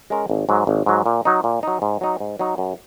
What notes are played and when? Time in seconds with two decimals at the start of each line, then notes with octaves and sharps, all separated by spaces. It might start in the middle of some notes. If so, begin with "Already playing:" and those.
0.10 G#3 C#4 A#4
0.30 G#1
0.49 G#2 F#3
0.67 G#1
0.86 G#2 F#3
1.06 A#2
1.25 F#3 D#4
1.44 A#2
1.63 F#3 D#4
1.82 G#2
2.01 F#3 D#4
2.20 G#2
2.39 F#3 D#4
2.58 F#2